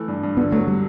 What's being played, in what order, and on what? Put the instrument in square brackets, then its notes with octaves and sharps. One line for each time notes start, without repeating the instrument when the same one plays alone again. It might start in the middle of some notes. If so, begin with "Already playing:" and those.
Already playing: [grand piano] E3 A3
G2
G2
[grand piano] D3 [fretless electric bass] B3
[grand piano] F#3 [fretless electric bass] A3
[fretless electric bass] G3